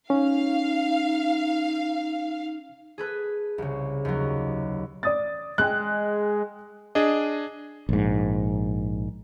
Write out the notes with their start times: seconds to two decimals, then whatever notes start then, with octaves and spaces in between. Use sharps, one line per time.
0.10 C#4 D#4 F5
2.98 G#4 A4 B4
3.58 C2 C#3
4.05 D#2 F#3
5.03 D5 D#6 A6
5.58 G#3 G5 F#6
6.95 D4 G#4 D#5
7.89 A#1 G#2